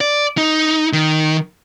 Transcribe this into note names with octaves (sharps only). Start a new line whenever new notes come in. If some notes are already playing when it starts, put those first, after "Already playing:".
D5
D#4
D#3